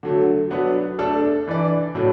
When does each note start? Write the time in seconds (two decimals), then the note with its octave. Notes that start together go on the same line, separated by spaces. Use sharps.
0.03 D3 F#3 A3
0.50 F#3 B3 D4 B4
0.99 A3 D4 A4
1.47 E3 D4 B4 D5
1.95 A2 F#3 A3 D4